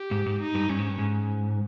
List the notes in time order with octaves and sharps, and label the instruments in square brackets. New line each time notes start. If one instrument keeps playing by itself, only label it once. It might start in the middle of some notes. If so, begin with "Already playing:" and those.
Already playing: [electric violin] G4
[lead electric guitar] G#2
G#2
[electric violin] D#4
[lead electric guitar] G2
[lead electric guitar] G2 [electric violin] C#4
[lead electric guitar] G#2
G2
G#2